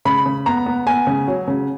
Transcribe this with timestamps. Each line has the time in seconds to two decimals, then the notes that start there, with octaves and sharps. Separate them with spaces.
0.05 C#3 B5
0.26 C#3
0.46 B3 A#5
0.66 B3
0.86 B3 G#5
1.07 C#3
1.28 F#3
1.48 C#3